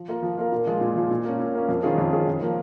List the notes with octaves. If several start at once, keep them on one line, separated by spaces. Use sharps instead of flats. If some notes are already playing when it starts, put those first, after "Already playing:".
Already playing: F3
A#3 F4 A#4
F3
A#3 F4 A#4
A#2
F3 G#3 F4
A#2
F3 G#3 F4
A#2
A#3 C#4
A#2
A#3 C#4
F2
D#3 C#4 F4 G#4
F2
D#3 C#4 F4 G#4
F2
F3 A#3